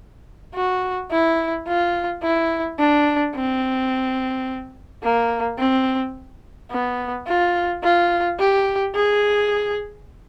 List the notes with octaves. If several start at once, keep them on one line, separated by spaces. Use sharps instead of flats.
F#4
E4
F4
E4
D4
C4
A#3
C4
B3
F4
F4
G4
G#4